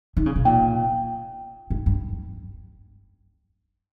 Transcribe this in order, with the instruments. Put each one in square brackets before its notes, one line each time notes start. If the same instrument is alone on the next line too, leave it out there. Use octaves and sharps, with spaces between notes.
[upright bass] D#3
C#3
B2
[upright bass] A#2 [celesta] G5
[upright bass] G#2
G2